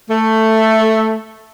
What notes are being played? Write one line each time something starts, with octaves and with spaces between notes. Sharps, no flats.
A3